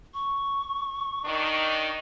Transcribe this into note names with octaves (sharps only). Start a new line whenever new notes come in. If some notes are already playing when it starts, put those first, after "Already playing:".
C#6
D#3 D4 D#4